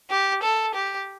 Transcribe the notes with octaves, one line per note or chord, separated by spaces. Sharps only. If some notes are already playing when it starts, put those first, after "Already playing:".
G4
A4
G4